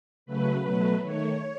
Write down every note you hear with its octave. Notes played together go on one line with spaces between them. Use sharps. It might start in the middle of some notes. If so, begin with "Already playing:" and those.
C#3 F#3 A3 B4
B2 F#3 A3
D#3 A3 C#5